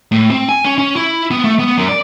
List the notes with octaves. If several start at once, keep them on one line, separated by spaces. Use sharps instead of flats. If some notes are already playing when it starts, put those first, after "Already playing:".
A2
C4
G#5
C#4
C#4
E4
B3
A3
B3
F#2
D5